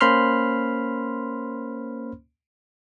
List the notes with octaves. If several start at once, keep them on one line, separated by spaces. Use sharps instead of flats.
A#3 C#4 C5 B5 C6 F6